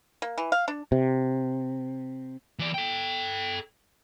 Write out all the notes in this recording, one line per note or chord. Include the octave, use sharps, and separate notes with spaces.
A#3
E3
F5
D4
C3
E3 D5
A4 G5